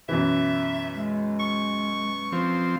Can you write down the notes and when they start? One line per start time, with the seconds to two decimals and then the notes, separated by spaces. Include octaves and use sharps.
0.09 F#2 B2 E3 E5
0.94 G#3
1.40 C#6
2.33 F3 C4